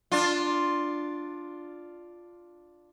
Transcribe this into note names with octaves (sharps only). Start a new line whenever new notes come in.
D4 F4